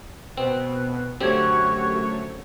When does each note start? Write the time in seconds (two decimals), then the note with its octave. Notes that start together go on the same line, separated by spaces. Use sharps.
0.37 B2 C4 B4
1.21 F#2 D3 A3 C4 F#4 G4 C#5 G#6